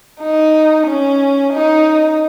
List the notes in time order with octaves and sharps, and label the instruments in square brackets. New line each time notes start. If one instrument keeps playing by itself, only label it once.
[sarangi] D#4
C#4
D#4